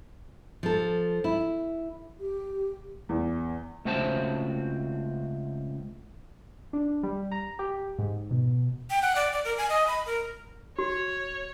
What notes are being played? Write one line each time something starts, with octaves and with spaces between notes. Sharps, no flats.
F3 A4
E4
G4
E2
C#2 A3 C4 F#4 C5 A5
D4
G3
A#5
G4
G#2
B2
G5
F#5
D5
D5
A#4
G#5
D#5
B5
A#4
F#4 C#5